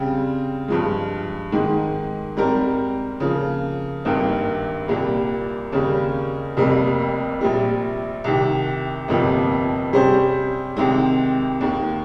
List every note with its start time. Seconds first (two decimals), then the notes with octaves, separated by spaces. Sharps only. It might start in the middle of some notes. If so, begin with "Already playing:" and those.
Already playing: C#3 G3 C4
0.68 G2 F3 G#3
1.52 G#2 D#3 G#3
2.37 G#2 G3 C4 G4 A#4
3.20 C#3 F3 A#3
4.05 G#1 G2 D#3 A#3
4.88 C2 A#2 G3 A#3
5.72 D#2 C#3 G3 A#3
6.57 F1 F2 C3 G3 A#3
7.41 A#1 A#2 G3
8.24 C2 C3 D#3
9.08 G1 F2 C3 F3 A#3
9.93 C3 G3 C#4 G#4 C5
10.77 C2 C3 D#3 G#3 C4
11.61 D#2 D#3 A#3